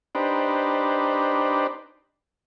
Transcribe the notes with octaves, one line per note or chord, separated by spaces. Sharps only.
D4 D#4 G4 B4 C5